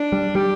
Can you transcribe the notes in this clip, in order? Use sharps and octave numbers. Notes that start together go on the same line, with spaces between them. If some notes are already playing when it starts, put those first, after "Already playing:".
Already playing: D4
G3
G3 G4